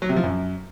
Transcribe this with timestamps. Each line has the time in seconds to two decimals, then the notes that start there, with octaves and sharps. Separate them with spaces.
0.02 F#3
0.09 C3
0.16 F3
0.24 F#2